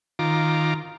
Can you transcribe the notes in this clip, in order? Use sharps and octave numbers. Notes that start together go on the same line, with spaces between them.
D#3 F4 A#5 D6